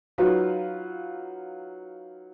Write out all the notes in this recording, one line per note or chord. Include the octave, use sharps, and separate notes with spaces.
F#3 D#4 F4 B4